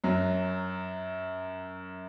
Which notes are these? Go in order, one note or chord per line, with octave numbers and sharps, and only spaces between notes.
F#2 F#3